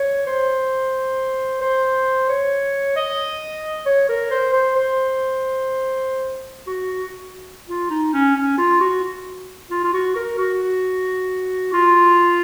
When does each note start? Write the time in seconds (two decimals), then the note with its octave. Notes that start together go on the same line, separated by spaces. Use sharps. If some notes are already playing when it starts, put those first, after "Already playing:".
Already playing: C#5
0.27 C5
1.61 C5
2.29 C#5
2.96 D#5
3.86 C#5
4.09 A#4
4.31 C5
4.53 C5
4.76 C5
6.67 F#4
7.68 F4
7.90 D#4
8.13 C#4
8.36 C#4
8.58 F4
8.80 F#4
9.71 F4
9.84 F4
9.93 F#4
10.15 A#4
10.38 F#4
11.73 F4